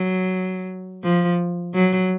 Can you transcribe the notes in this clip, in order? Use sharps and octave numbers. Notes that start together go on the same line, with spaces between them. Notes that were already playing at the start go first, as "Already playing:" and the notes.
Already playing: F#3
F3
F#3